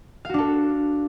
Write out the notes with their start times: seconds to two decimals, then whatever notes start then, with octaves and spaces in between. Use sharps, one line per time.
0.25 F5
0.29 F#4
0.34 D4
0.39 A4